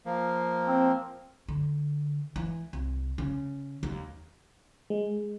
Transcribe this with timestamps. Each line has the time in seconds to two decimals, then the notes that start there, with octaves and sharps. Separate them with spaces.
0.06 F3 A#3
0.67 C4
1.48 D3
2.36 E3
2.73 C2
3.18 C#3
3.83 D#2
4.90 G#3